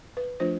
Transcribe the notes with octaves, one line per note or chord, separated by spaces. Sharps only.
B4
F3 A3 D4 F4 C5